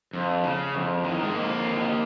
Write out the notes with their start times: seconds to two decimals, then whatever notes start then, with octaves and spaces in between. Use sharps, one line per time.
0.13 F2
0.44 C#3
0.74 F2
1.04 D#3
1.23 G#3
1.34 F2 A#3
1.64 D#3